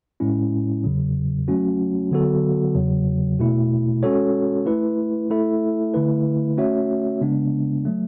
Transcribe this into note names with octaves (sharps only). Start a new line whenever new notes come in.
A2 G#3 C#4 E4
E2 C#3 F#3
F#3 A3 C#4 F#4
D3 F#3 B3 F#4 A4
E2 C#3 F#3
B2 A3 E4
G#3 C#4 F#4 A4 C#5
A3 E4 B4
A3 E4 A4 E5
D3 A3 E4 B4
A3 C#4 F#4 C#5 E5
C#3 G#3 B3 D4
F#3 A3